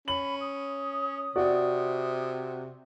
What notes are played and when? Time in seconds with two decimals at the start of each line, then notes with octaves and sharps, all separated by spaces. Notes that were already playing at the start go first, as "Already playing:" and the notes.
0.08 C#4 B5 F#7
0.41 D#6
1.36 C3 F#4 D5